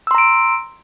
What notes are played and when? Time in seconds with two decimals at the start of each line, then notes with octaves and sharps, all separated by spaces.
0.07 E6
0.11 C6
0.15 A#5
0.18 D7